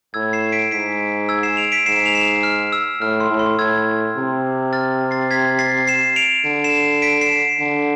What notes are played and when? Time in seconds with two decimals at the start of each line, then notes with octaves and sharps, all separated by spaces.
0.14 A2 E6 G#6
0.33 C7 E7
0.52 B6 D7
0.71 G#2 B6 D7
1.29 E6 G#6
1.43 C7 E7
1.57 D7 F7
1.72 B6 D7
1.86 G#2 C7 E7
2.06 F7
2.15 C7 E7
2.43 F6
2.73 E6
3.01 A2 F6
3.20 C6
3.30 A2
3.39 C6
3.59 A2 E6 G#6
4.17 C3
4.73 F6 A6
5.11 A6 C7
5.31 G#6 B6
5.59 A6 C7
5.87 C7 E7
6.16 D7 F7
6.45 D3
6.64 C7 E7
7.02 B6 D7
7.21 C7 E7
7.60 D3